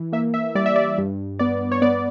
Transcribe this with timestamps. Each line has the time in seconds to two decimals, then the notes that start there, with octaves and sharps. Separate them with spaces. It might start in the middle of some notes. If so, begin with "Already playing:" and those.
Already playing: E3
0.12 A#3 E5
0.34 E5
0.55 G3 D5
0.66 E5
0.76 D5
0.98 G2
1.39 B3 D5
1.72 C#5
1.82 B3 D5